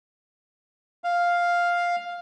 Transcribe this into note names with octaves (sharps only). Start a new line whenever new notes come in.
F5